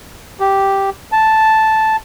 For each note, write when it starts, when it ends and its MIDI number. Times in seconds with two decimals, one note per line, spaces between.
0.40 0.90 67
1.12 1.96 81